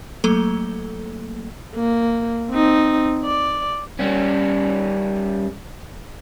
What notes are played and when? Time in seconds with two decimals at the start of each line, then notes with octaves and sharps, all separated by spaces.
0.24 F#3 A3 A#3 A4
1.76 A#3
2.50 C4 D#4
3.25 D5
3.99 G3 C#4